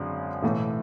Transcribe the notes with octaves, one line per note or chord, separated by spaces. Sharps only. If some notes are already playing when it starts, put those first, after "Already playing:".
Already playing: G#1 F#2 D3 G#3 D4
B1 A2 E3 A3